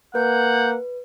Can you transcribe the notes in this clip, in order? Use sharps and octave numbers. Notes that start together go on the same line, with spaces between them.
A#3 B4 F#5 G6